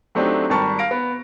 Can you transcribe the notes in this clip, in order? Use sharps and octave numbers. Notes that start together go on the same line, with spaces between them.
F#3 A3 C4 D4 D#4 G4
G#1 G3 A#4 A5 C#6
F5 A#6 D7
B3